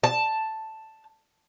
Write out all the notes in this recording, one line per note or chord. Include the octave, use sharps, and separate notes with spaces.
A5